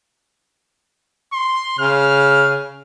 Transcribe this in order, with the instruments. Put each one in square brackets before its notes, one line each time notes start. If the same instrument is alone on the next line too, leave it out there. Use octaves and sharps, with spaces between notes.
[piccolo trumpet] C6
[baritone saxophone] C#3 [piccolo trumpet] F6